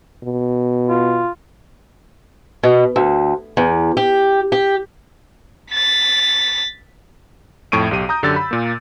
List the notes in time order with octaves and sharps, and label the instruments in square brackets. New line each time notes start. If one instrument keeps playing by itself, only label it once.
[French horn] B2
[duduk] F4
[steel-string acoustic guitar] B2
D2
E2
G4
G4
[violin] A6 B6
[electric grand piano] F2 A2 C#6 D7 D#7
B1 G4 D#7
A#5 D#6 G6
F#2 D3 G4 E6 A6
B5
A#2 A#3